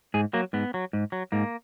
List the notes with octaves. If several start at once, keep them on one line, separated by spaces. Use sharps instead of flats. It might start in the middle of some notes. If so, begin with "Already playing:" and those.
G#2 G#4
F#3 A#3
G#2 B3
F#3
G#2
F#3
G#2 A#3